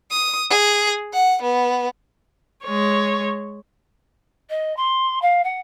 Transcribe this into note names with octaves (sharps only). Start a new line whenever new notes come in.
D#6
G#4
F#5
B3
G#3 C#5
D#5
C6
F5
F#5